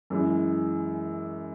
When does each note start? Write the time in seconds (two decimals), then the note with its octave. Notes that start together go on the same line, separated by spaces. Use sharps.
0.10 F#2 E3 G#3